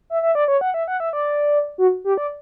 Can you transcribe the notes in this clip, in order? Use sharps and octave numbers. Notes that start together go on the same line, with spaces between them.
E5
E5
D5
C#5
F#5
E5
F#5
E5
D5
F#4
G4
D5